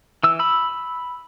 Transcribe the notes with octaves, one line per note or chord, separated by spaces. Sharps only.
E3 E6
B5 E6